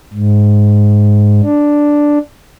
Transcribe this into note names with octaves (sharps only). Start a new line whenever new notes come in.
G#2
D4